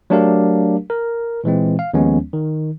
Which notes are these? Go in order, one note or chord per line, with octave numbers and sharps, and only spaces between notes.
F#3 A3 D4 G4 A#4 F5
A#4
A#2 E3 G#3 C4
F5
D#2 F3 G#3 B3 C#4
D#3